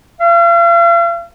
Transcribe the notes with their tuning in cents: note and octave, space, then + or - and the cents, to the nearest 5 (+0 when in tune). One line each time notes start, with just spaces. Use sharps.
F5 -40